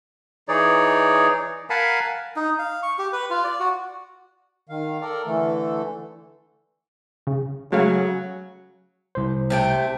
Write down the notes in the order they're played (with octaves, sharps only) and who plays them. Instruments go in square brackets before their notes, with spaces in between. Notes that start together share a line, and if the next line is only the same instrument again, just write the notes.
[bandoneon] E3 D#4 G#4 C#5 D5
A#4 F5 F#5 G#5 A5 B5
[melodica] D#4
F5
C#6
G4
B4
F4
D5
F#4
[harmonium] D#3 F5
A4 A#4 D5
D3 E3 A3 A4
[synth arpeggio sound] C#3
[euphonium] C#3 [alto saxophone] F#3 [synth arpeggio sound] G#3 A3 F5
[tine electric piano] C2 C5
[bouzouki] C3 A3 G5